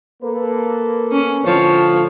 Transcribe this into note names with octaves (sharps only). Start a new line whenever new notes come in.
A#3 A4 B4
C#4
A2 D3 F3 C#5